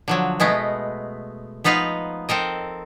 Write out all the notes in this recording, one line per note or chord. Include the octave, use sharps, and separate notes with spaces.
D3 F3 F#3
B2 G#3 A3 B3
F3 B3 D#4 B4 F5
C4 A4 A#4 D#5